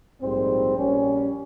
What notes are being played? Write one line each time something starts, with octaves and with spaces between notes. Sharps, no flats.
A#1 G#2 G3 C4
A#1 A#2 G3 C#4